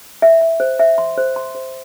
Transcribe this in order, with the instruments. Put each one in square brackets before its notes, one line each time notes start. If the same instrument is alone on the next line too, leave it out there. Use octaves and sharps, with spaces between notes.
[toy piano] E5
E5
C5
E5
C6
C5
C6
C5